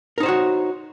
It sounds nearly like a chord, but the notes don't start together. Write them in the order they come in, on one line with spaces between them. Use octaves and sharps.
A#4 D#4 C5 C#5 F#4